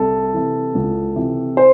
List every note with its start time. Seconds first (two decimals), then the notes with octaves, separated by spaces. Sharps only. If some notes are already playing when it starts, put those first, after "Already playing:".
Already playing: C2 A4
0.33 C3 E3
0.75 C#2
1.16 C3 E3
1.57 C5